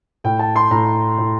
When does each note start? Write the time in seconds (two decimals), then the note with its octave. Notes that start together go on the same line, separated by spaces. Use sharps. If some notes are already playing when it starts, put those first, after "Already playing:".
0.24 A2 G5
0.39 A5
0.56 C6
0.71 A2 A#5
1.18 A2